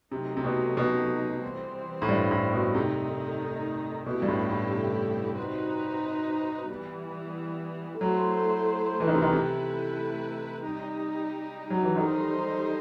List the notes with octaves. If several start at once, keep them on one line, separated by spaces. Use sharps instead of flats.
C3 D#3 F#3 A3 D#4
C3
B2
B2
E3 G3 C4
A2
G2
A2
B2
C3 D#3 A3 D#4
B2 A3 E4 G4
G2
A2
A2
C3
C4 D#4 F#4 B4
E3 G3 B3
F#3 A3 E4 A4 C5
E3
D#3
C3
D#3
C3 A3 E4 B4
G3 D#4 G4
F#3
E3
D#3 G3 D#4 A4 C5